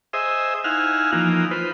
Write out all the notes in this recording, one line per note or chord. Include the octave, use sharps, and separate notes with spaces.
G#4 C5 D#5 E5
D#4 E4 F5 F#5 G#5 F6
E3 F3 A#3 D#4
F4 B4 C5